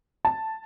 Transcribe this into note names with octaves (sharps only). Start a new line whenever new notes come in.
A5